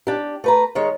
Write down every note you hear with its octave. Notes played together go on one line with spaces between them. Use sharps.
D4 G4
A3 B4 A#5
D#3 G#3 C#5